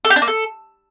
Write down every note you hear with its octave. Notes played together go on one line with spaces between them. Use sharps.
A4
G4
D4
A#3
A4